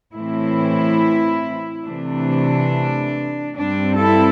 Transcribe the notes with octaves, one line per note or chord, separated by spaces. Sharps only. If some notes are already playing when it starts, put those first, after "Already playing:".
A2 E3 C4 E4
C3 E3 A3 D4
G2 G3 C4 D4
E4 A4